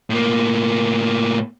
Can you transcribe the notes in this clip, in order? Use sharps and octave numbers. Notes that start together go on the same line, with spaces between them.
A2 A#3